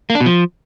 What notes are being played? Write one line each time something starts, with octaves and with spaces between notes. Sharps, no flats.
A#3
D4
B2
F3